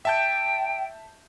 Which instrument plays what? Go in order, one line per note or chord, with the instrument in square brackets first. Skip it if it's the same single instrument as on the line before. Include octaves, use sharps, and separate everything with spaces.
[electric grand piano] E5 A5 G6 [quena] G5